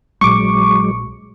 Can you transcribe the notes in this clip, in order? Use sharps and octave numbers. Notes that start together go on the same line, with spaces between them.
A#1 F#3 G#3 C#6 D6